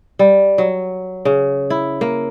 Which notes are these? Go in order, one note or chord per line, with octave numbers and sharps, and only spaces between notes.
G3
F#3
C#3
E4
A#3